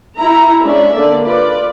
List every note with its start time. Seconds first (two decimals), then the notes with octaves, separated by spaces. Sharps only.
0.19 E4 E5 A#5
0.63 G#3 C#4 D4 D5 E5
0.95 D3 A#3 A4 D5
1.25 F4 B4 D5